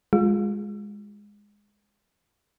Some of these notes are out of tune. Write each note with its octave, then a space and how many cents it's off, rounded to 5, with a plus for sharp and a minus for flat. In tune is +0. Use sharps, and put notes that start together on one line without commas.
G#3 -10 F4 +20